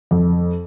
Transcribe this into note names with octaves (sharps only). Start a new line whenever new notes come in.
F2